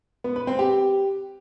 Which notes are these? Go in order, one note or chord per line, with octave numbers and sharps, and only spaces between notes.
B3
B4
C4
G4